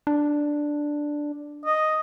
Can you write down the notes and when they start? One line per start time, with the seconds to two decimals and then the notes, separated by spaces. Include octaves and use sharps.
0.07 D4
1.66 D#5